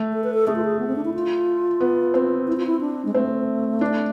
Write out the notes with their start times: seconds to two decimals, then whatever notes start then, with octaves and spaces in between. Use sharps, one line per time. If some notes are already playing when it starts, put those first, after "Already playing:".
Already playing: A3
0.13 A4
0.24 B4
0.34 A4
0.47 A3 G#4
0.56 F4
0.65 G#4
0.79 B3
0.87 C4
0.96 D4
1.05 E4
1.14 F4
1.80 B3
2.14 C4
2.47 E4
2.57 F4
2.67 E4
2.81 D4
3.05 G#3
3.14 A3 C4
3.81 D4